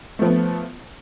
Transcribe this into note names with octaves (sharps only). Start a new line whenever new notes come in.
F3 A3 B3